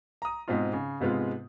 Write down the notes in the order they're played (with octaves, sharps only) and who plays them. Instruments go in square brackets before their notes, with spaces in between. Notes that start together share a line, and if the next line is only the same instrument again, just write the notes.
[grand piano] A#5 D#6
G#2 B2 C4 D#4 F4
C#3
G#2 C3 G#3 B3 F4